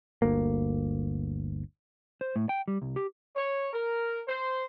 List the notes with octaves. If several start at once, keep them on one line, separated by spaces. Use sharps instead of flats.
G1 D2 A#3
C5
A2
G5
G3
C2
G4
C#5
A#4
C5